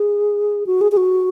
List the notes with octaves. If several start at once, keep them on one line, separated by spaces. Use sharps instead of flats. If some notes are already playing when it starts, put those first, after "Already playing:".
Already playing: G#4
F#4
G#4
G#4
F#4